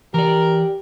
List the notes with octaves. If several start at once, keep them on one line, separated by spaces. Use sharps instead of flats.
E3 G4 A#4 D5